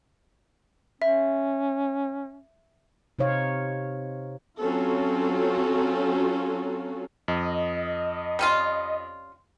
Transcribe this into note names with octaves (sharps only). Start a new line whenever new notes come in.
C#4 E5
C3 D#4 C5 C#5 F5
F#3 C4 C#4 F4 F#4 A4
F2 D#5
G3 C#4 F4